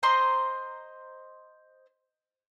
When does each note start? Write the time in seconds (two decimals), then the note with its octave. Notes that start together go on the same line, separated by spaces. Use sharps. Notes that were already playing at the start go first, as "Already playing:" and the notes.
0.03 C5 D#5 A#5 C6